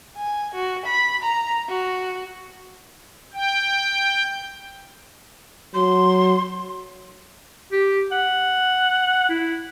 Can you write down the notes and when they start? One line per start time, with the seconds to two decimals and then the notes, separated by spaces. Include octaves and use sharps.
0.17 G#5
0.54 F#4
0.86 B5
1.22 A#5
1.69 F#4
3.34 G5
5.74 F#3 C6
7.72 G4
8.12 F#5
9.29 E4